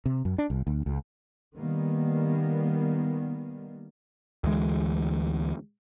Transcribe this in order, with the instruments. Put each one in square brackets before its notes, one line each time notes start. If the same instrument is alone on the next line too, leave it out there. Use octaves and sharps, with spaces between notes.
[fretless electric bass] C3
F#2
D4
C2
D2
C#2
[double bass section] D#3 G3 A#3 B3
[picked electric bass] D2 E3 G#3